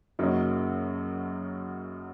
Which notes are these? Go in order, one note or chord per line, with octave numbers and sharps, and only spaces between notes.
F#2 C#3 F#3 A#3 D#4